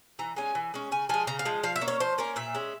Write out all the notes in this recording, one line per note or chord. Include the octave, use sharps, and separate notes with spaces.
E3 A#5
G#3 C#4 G#5
E3
G#3 C#4
C#3 G#5
F3 G#3 G#5
C#3 A#5
F5
F3 G#3
F3 F5
E5
A#3 C#4
C#5
F3 C5
A#3 C#4 A#4
A#2 E5
G#3 C#4